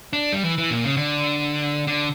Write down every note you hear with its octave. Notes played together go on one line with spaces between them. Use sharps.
D4
G3
E3
E3
A#2
C#3
D3
D3